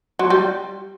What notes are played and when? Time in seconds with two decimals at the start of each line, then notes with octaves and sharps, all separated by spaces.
0.19 F#3
0.30 G3